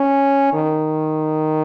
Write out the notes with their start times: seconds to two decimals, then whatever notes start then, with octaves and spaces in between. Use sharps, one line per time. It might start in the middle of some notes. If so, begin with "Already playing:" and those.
Already playing: C#4
0.53 D#3